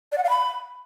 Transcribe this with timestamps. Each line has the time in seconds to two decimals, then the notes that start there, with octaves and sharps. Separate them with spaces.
0.12 D5
0.18 F#5
0.24 F5
0.29 B5